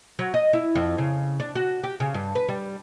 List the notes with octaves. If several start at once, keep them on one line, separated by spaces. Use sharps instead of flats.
F#3
D#5
E4
F2
C#3
D4
F#4
G4
C#3
G2
B4
G3